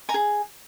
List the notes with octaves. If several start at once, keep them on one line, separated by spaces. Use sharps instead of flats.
G#5 A#5
G#4